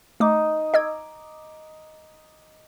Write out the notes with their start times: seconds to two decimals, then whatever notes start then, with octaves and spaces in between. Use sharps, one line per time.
0.20 A3 D#4 D6
0.74 D#5 D6 E6 G#6